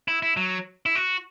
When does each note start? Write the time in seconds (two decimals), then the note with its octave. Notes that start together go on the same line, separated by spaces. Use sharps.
0.08 E4
0.23 E4
0.37 F#3
0.86 E4
0.95 F#4